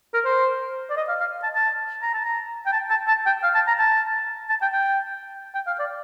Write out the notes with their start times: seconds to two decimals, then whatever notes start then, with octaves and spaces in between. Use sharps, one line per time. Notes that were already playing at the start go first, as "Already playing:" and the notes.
0.14 A#4
0.25 C5
0.90 D5
0.97 D#5
1.08 F5
1.20 F5
1.43 A5
1.56 A5
2.02 A#5
2.14 A5
2.25 A#5
2.66 G5
2.72 A5
2.90 A5
3.08 A5
3.26 G5
3.43 F5
3.54 A5
3.67 A#5
3.79 A5
4.49 A5
4.62 G5
4.72 G5
5.55 G5
5.67 F5
5.79 D5